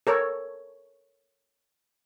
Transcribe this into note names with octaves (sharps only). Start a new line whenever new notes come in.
A4 A#4 C#5